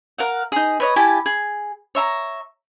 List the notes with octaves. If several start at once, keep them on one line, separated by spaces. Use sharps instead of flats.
A#4 F5 F#5
D#4 G#4
B4 C#5 D#5
E4 G4 G#5 A5
G#4
C#5 E5 A#5